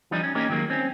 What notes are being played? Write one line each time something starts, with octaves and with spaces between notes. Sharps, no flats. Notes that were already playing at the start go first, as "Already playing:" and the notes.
E3 F3 G3 D4 D#4
C#4
A#3 C#4 D#4 G4 A#4
D#3 F#3 G#3 A#3
C4 C#4